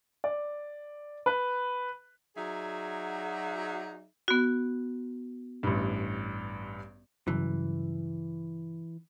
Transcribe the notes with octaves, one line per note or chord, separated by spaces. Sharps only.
D5
B4
F#3 D#4 F#4 G#4 D5 E5
B3 F#4
A1 G2
G2 C#3 E3 F#3